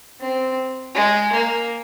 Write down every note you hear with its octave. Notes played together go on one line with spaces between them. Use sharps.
C4
G#3
A#3